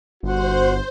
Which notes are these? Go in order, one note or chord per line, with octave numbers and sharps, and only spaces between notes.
G1 F#4 C5